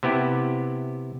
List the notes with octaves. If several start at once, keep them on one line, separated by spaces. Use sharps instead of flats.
C3 B3 E4 G4